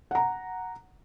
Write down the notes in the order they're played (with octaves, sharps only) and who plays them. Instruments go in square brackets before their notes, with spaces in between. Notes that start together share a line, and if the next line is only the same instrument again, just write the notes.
[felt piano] F#5 A#5